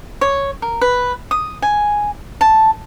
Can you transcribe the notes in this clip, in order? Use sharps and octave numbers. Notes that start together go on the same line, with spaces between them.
C#5
A#4
B4
D#6
G#5
A5